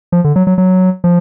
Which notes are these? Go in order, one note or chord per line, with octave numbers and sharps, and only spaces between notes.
F3
D3
F#3
F#3
F#3
F3